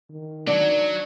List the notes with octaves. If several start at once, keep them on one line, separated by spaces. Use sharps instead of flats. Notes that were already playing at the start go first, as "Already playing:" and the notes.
D#3
F#3 D4